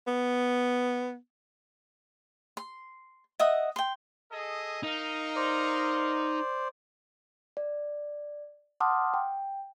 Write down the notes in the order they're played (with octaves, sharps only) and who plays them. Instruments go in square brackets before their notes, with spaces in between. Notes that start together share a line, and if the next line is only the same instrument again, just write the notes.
[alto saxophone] B3
[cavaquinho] C6
D#5 E5 F#5 D#6
G5 C6
[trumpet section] G#4 A4 D#5
[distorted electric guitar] D#4 [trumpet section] A#4 D#5 F5
[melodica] C5 D5
[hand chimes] D5
F#5 A5 C6 D6 D#6 F6
G5